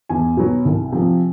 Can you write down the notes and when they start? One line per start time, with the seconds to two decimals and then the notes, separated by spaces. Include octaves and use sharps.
0.09 E2 G#5
0.37 B2 F#3
0.65 C2
0.92 C3 F3